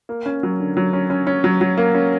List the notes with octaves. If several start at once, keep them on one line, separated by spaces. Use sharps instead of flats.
A#3
C#4
F#3
D3
F#3
C#4
C#4
C#4
F#3
F#3
A#3
C#4